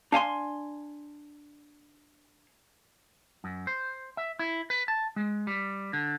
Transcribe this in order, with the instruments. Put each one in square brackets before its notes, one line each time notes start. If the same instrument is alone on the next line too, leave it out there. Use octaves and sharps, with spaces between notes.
[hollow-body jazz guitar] D4 F5 G#5 C6
[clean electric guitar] F#2
C5
E5
E4
B4
A5
G#3
G3
D3